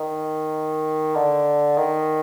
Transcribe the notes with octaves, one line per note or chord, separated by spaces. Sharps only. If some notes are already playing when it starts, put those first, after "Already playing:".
Already playing: D#3
D3
D#3